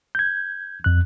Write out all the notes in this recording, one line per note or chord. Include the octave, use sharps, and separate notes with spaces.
G6 G#6
F2 F#6